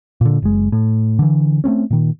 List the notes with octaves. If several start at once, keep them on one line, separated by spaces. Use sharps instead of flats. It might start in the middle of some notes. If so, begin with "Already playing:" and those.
A#2 D3
F#1 G#3
A2
D3 E3
A3 A#3 C4 C#4
A#2 D#3